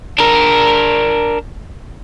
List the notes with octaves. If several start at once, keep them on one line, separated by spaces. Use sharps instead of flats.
D4 A#4